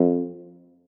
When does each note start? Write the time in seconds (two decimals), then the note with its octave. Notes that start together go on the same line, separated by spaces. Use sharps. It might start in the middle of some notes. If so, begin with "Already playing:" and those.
Already playing: F2